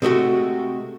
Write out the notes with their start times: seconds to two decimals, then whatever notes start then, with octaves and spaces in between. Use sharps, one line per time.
0.02 C3 G#3 A3 F#4